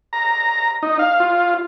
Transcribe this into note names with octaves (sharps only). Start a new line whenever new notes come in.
A#5
D#4
F5
F4